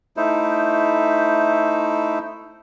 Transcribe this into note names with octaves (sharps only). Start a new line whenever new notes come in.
A3 D#4 E4 C5